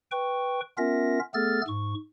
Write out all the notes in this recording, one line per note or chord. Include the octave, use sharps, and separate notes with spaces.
B4 G5 C#6
B3 C#4 F4 A#4 E5 A#6
A3 B3 G#4 A4 F6 A6
G#2 C#6